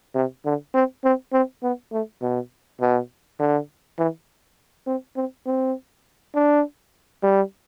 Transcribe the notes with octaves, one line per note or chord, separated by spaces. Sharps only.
C3
D3
C4
C4
C4
B3
A3
B2
B2
D3
E3
C4
C4
C4
D4
G3